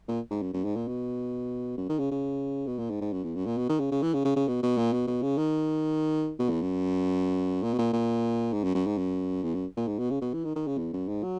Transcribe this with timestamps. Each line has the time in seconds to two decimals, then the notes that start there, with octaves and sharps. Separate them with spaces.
0.08 A#2
0.31 G#2
0.42 F#2
0.53 F#2
0.64 G#2
0.76 A#2
0.88 B2
1.77 F#2
1.89 D#3
1.99 C#3
2.11 C#3
2.67 B2
2.78 A#2
2.90 G#2
3.01 G#2
3.13 F#2
3.24 E2
3.35 F#2
3.46 A#2
3.57 B2
3.69 D#3
3.79 C#3
3.91 C#3
4.02 E3
4.14 C#3
4.25 C#3
4.36 C#3
4.48 B2
4.63 B2
4.77 A#2
4.93 B2
5.07 B2
5.22 C#3
5.38 D#3
6.39 B2
6.49 E2
6.61 F#2
7.63 A#2
7.74 B2
7.78 A#2
7.93 A#2
8.53 G#2
8.64 F#2
8.75 F#2
8.87 G#2
8.98 F#2
9.43 E2
9.54 F#2
9.77 A#2
9.88 G#2
9.99 B2
10.10 C#3
10.21 B2
10.33 E3
10.44 D#3
10.55 D#3
10.67 C#3
10.78 E2
10.93 F#2
11.08 G#2
11.23 F#3